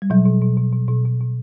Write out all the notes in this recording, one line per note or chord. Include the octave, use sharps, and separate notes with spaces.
G3
B2 F#3
B2
B2
B2
B2
B2
B2
B2